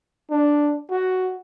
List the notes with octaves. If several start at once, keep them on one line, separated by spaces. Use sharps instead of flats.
D4
F#4